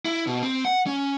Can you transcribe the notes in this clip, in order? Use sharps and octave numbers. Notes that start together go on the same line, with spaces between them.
E4
B2
C4
F#5
C#4